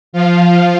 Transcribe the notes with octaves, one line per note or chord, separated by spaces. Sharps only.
F3 F4